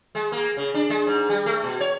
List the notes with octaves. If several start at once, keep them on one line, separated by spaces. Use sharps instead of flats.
G#3
A#3
C#3
D4
G#3
G#2
G3
A3
B2
C#5